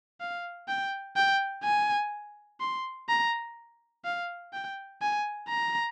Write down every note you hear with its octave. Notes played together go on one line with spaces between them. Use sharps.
F5
G5
G5
G#5
C6
A#5
F5
G5
G#5
A#5